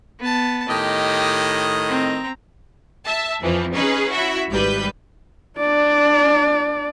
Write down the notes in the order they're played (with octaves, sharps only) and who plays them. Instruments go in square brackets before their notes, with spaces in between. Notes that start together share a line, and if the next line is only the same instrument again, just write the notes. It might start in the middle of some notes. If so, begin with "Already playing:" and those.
[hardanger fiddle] B3 A5
[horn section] A2 D#3 D#5 [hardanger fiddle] G4
[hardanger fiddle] C4 A#5
[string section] E5 A5
F2 E3 F3
C#4 D#4 G#4 B4
E4 F#4 E5
G#1 G3 B4 G6
[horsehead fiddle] D4 D5